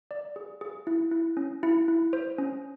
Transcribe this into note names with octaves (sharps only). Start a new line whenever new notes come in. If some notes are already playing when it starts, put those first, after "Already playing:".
D5
G#4
G#4
E4
E4
C#4
E4
E4
C5
C#4